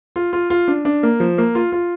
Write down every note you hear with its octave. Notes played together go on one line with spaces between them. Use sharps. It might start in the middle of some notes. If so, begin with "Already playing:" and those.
F4
F4
F4
D4
D4
A#3
F3
A#3
F4
F4